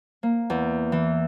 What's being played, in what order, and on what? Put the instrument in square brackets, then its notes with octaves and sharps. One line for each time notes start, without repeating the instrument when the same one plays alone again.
[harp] A#3
E2
E3